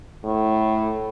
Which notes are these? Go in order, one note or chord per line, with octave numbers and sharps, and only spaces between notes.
A2